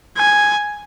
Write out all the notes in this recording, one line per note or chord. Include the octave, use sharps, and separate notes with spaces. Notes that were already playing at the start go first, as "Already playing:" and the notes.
G#5